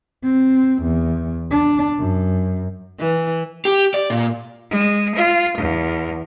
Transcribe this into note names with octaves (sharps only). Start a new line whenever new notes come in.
C4
E2
D4
F#2
E3
G4
D5
A#2
G#3
F4
E2